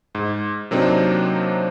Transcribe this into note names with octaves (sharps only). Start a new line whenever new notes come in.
G#2
C3 F#3 A#3 C4 D4 D#4